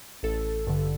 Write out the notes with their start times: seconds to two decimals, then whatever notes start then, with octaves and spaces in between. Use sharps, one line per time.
0.23 A1 A4
0.67 G2 D3